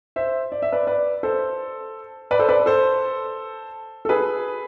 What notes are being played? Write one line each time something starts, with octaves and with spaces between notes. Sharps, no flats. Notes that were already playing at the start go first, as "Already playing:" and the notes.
C5 E5
D5
E5
B4 D5
B4 D5
A4 C5
B4 D5
A4 C5
B4 D5
A4 C5
A4
G#4 B4